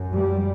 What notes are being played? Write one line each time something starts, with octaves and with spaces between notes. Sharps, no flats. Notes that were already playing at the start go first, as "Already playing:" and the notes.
Already playing: F#2
G3